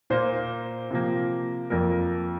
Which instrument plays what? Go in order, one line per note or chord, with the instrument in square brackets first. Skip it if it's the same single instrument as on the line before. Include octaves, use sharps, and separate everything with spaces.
[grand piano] A#2 A#3 C5
C3 F3 A#3
F2 F3 A#3 A#4